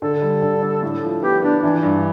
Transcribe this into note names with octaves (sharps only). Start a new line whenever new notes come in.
D3 A4
G3
D3
D4
A2
F3
B3 G4
B3 D4
E3 D4
G2